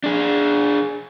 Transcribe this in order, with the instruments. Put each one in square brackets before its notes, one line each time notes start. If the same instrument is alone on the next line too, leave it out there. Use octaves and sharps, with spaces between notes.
[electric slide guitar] D4 G#4